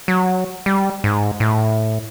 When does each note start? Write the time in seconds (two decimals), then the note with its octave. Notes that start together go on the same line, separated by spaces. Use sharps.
0.08 F#3
0.66 G3
1.04 G#2
1.40 A2